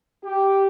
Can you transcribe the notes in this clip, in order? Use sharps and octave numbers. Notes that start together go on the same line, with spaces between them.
G4